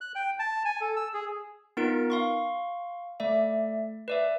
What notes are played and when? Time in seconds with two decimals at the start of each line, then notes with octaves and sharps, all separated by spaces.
0.01 F#6
0.15 G5
0.39 A5
0.65 G#5
0.81 A4
0.96 E6
1.14 G#4
1.77 B3 D#4 F4 A#4 D7
2.10 F5 C6 C#6
3.20 A3 D5 E5
4.08 B4 D5 E5